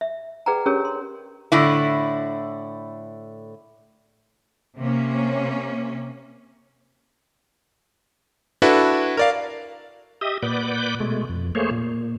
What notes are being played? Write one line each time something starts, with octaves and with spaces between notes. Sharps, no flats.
E5
G#4 B4 D5 F#5 G5 A#5
C#4 D4 G4 G#4 A#4 C#5
C6
A2 D3 E4
C3 A#3 C#4
D4 E4 F#4 A4 B4 E5
A#4 D5 F5
G4 D#5 E5 D#6
A#2 B4 D5 F#5 D6 G6
B2 G#3 A3
F2
A3 A#3 G#4 C5 C#5
A#2